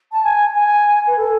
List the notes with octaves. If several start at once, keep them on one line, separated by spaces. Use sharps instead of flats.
A5
G#5
G#5
B4
A4